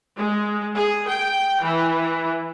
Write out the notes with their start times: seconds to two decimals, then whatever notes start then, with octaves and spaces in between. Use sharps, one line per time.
0.17 G#3
0.75 G#4
1.08 G5
1.62 E3